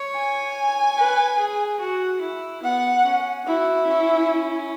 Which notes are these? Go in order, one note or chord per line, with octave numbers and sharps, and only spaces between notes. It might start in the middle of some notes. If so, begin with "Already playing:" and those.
Already playing: C#5
G#5
B4
G#4
F#4
E4
B3 F#5
C#4
E4 F#4
C#4